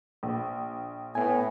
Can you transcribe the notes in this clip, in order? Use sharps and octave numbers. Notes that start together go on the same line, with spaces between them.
A#1
A2 B3 G#5